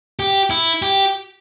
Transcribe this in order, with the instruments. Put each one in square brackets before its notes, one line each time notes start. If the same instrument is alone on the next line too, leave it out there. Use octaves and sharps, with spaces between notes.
[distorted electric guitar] G4
E4
G4